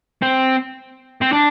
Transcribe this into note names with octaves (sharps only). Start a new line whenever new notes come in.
C4
C4
D4